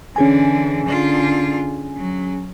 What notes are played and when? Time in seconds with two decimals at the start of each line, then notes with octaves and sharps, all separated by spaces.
0.16 D3 E3 C#4 G#4 G#5
0.86 D3 F4
1.97 F#3